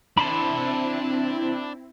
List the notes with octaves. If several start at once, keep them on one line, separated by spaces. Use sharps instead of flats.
C4 D4 E4 A5 B5 C6